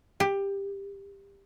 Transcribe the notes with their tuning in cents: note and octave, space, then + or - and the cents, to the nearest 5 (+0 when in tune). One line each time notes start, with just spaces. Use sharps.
G4 +15